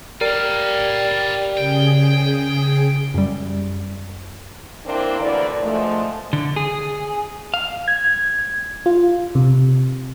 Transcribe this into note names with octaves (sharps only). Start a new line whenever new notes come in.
G3 A#4 D5 F5
C#3 G#4 G5
F#2 G3
A#3 C4 D4 E4 A#4
D2 D3 E3 A#4 D5
D3 F3 G#3 A3
D3
G#4
F5
G#6
F4
C3